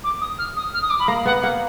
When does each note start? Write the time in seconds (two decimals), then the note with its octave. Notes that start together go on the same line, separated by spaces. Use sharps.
0.04 D6
0.21 D#6
0.38 F6
0.56 D#6
0.74 F6
0.82 D#6
0.90 D6
0.99 B5
1.08 A#3 A#5
1.25 B3 F#5
1.42 A#3 F#5